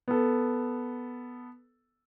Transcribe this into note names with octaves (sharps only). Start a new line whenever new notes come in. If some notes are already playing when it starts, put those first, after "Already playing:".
B3 A4